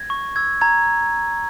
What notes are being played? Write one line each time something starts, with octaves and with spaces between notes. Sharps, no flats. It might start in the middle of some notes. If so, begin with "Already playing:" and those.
Already playing: G#6 A#6
C#6
E6 G#6
A#5 G#6